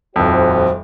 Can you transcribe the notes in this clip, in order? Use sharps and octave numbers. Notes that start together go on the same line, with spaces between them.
D#1 F2 F#4 C5